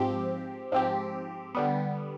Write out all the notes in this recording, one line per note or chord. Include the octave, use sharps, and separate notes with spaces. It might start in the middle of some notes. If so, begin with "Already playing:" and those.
Already playing: G#2 F3 C4 G4
G#2 F3 C4 G4
D3 G3 B3